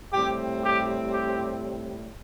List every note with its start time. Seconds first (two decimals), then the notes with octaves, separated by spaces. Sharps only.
0.12 A2 G3 C4 G4
0.61 G4
1.09 G4